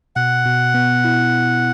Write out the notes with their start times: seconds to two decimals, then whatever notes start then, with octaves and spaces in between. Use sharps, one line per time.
0.16 B2 F#5
0.45 B2
0.74 B3
1.05 E4